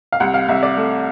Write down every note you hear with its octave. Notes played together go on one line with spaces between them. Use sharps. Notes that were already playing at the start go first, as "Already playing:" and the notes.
F5
C2 F#5
F5
C2 E5
D5
A3